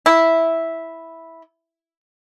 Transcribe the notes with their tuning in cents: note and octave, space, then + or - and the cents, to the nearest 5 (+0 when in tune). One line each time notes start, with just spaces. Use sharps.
E4 -5